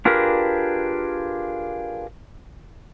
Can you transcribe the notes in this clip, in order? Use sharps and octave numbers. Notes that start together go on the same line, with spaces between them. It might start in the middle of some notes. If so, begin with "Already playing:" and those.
D4 F4 G4 G#4 A#4 B4